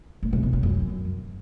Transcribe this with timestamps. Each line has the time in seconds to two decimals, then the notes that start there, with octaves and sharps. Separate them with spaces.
0.23 A2
0.33 C3
0.43 B2
0.53 C#3
0.63 F#2